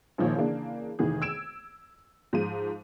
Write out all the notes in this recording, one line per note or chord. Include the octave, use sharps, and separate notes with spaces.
A#1 D#3 F3 A#3 C#5
C#3 E3 A#3 D4
F1 D#3 E3 G#4
E6 G#6 D7 E7
G#2 F3 D#7